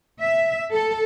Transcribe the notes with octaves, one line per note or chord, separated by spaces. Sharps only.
E5
A4